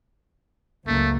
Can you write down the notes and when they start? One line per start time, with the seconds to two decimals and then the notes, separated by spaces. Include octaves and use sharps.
0.87 F#1 C#2 A3 A#3